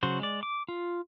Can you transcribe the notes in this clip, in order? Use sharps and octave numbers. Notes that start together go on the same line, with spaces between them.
C#3 F#3 F#4 C5
G#3 D5
D6
F4